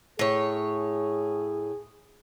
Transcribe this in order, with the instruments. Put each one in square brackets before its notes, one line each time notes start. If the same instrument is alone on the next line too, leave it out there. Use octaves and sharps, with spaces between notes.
[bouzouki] A2 C#5 [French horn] G#4